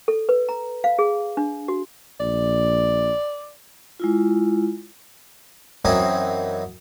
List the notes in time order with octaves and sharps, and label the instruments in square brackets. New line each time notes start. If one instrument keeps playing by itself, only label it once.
[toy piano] A4
B4
A#5
F5
G#4
D4
F#4
[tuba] A#1 [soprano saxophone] D5
[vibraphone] G#3 E4 F4
[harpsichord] F#2 E3 F#3 C4 D#4